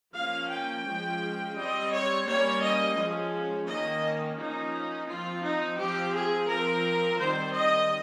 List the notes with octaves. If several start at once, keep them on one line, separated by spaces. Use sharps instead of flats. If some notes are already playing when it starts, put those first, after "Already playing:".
F3 A#3 C#4 F5
G5
F3 G#3 C#4
G3 C4 D#5
C#5
G3 A#3 C#4 C#5
D#5
F3 G#3 C#4
D#3 A#3 C#4 D#5
F3 A#3 C#4 D#4
F3 C4 F4
D#4
F3 C4 G4
G#4
F3 C4 A#4
D#3 G3 C4 C5
D#5